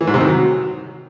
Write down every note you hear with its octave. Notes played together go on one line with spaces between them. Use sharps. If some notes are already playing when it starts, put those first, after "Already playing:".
E3
G#2
C3
D#3
F#3